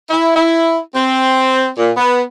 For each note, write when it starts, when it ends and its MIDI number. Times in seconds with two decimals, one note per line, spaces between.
0.10 0.35 64
0.35 0.77 64
0.94 1.68 60
1.77 1.91 46
1.97 2.22 59